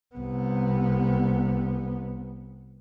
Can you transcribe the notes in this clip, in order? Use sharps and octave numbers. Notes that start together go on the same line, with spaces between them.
C2 B3